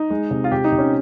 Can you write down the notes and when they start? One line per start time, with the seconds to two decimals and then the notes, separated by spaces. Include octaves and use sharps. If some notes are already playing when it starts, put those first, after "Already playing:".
Already playing: D#4
0.10 G#3
0.31 C3
0.44 F4
0.52 C3 G4
0.64 D#4
0.72 C3
0.78 C#4